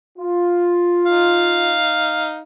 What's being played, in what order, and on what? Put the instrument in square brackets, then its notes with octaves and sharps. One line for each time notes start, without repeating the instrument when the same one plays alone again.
[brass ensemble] F4
[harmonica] D#4 F5